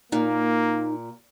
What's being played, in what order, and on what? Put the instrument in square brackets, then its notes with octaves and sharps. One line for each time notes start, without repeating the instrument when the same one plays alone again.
[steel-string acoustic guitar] A#2 [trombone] A#3 [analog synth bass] D#4